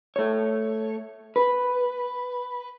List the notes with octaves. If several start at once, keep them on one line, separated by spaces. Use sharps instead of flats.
A3 C#5
B4